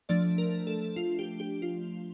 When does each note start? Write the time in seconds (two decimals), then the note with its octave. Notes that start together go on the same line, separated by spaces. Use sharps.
0.09 F3 A3 D4 D5
0.38 A#4
0.67 A4
0.96 F4
1.19 G4
1.40 G4
1.62 F4